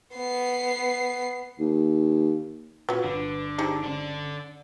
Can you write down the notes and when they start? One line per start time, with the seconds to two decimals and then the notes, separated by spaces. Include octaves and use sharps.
0.16 B3 C7
1.60 D#2
2.89 A#2 B3 C#4 F4 F#4
3.04 G1 D3 B4
3.58 C4 D#4 G4 G#4 A5
3.84 D3 C#4 D4 A4